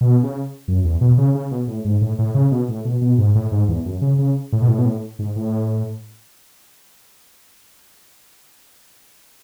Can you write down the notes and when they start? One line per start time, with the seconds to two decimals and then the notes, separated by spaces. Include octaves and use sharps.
0.01 B2
0.23 C#3
0.68 F#2
0.85 E2
1.01 B2
1.18 C#3
1.35 C#3
1.51 B2
1.68 A2
1.85 G#2
2.01 A2
2.19 A2
2.34 C#3
2.52 B2
2.69 A2
2.85 B2
3.02 B2
3.18 G#2
3.35 A2
3.52 G#2
3.68 E2
3.86 F#2
4.02 C#3
4.19 C#3
4.52 A2
4.62 B2
4.68 A2
4.78 B2
4.85 A2
5.19 G#2
5.36 A2